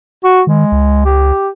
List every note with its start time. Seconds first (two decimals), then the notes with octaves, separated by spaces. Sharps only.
0.24 F#4
0.47 D#3 G#3
0.72 C#2
1.05 G4